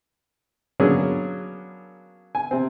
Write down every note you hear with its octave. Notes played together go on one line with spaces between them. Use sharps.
F#3 A#3 B3 C#4 D4 G#4
G#5
C3 C4